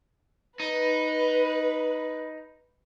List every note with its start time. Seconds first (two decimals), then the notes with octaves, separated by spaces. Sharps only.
0.60 D#4 B4